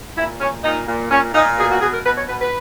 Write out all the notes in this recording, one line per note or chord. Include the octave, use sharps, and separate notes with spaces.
A#2 E4
A#2 C#4
A#2 D#4
A#2
A#2 C#4
A#2 D#4
B2 G#4
F#4
B2 G#4
A#4
B2 B4
C#5
B2 B4
B4